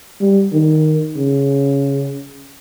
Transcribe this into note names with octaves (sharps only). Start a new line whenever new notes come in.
G3
D#3
C#3